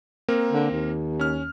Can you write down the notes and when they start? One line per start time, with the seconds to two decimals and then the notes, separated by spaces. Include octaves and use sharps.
0.28 A#3 C4 A#4
0.51 D3
0.71 D#2
1.19 C#4 F6